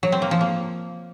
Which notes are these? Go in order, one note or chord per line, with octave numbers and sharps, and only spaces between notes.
F#3
C4
A#3
F3
A#3